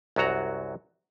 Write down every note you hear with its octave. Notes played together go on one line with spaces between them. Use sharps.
C2 F#2 F#3 F#4 A#5